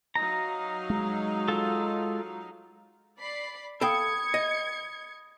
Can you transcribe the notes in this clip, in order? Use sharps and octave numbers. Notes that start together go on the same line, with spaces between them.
F#3 D#4 F5 A#5
G#3
F4 A4
D5 B5 C7
A4 F5 G5 B5 D#6 G#6 C#7
D#5